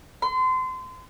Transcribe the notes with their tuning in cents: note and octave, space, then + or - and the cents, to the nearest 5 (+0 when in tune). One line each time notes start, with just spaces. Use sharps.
C6 -30